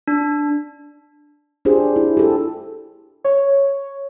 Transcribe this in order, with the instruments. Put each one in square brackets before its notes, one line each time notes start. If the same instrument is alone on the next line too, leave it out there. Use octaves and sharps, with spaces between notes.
[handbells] D4
[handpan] D4 F4 G4 G#4 C5
E4
G4 A4
[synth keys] C#5